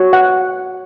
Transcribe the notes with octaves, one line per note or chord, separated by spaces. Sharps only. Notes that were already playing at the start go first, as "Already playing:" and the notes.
Already playing: F#4 C#5
F#5